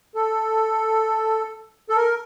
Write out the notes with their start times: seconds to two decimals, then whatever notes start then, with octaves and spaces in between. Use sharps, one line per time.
0.15 A4
1.89 A4
1.97 A#4